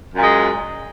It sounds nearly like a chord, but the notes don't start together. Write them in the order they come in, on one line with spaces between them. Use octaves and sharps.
F#2 A#2 G#3